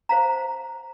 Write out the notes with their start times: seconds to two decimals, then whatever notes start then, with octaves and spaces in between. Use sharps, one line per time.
0.09 C5 F5 A#5